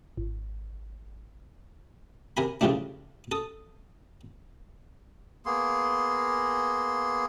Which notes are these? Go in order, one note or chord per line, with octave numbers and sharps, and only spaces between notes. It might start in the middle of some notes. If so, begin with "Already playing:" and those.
G#1
C3 A#4 G#5 B5
C#3 E3 F3 G3 A3 D4
A4 D#6
A#3 B3 G#4 C6